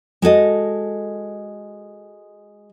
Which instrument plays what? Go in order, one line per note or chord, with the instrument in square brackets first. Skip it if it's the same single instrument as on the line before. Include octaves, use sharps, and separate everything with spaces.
[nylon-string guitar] G#3 F#4 A4 D#5